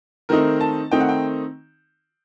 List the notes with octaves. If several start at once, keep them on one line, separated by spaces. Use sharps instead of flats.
D#3 A3 C4 D#4 A#4
A5
D#3 A3 C4 D#4 G5
F#5
G5